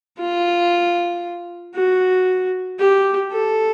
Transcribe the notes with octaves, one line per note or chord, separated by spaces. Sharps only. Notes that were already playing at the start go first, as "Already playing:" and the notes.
F4
F#4
G4
A4